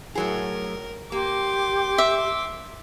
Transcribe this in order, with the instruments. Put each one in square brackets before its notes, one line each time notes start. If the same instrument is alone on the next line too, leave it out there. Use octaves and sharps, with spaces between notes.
[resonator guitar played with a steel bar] A2 F#3 G#4 [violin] A#4
[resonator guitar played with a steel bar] A#3 [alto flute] G4 [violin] C6 D6
[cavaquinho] E5